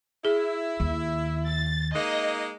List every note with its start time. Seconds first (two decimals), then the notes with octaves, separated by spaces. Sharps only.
0.25 E4 G#4
0.80 D#2
1.46 A6
1.95 G#3 A#3 D#4 D#5